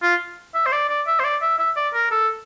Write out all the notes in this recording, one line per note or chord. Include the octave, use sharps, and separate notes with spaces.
F4
E5
C5
D5
D5
E5
C5
D5
E5
E5
D5
A#4
A4